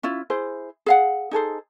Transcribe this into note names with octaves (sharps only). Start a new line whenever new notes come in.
C#4 E4 F4
E4 G#4 C5
G#4 F5 F#5
D#4 G#4 A4 C5